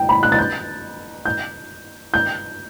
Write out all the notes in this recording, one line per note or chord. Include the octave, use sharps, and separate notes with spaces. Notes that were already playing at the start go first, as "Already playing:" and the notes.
Already playing: G5
B5
F#6
A6
G6
G6
G6